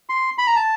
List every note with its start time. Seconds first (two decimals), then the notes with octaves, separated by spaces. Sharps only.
0.09 C6
0.38 B5
0.47 A#5
0.56 A5